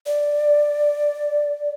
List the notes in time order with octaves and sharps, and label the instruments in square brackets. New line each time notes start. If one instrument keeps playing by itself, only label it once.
[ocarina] D5